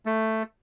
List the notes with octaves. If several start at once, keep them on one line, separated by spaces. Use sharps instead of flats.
A3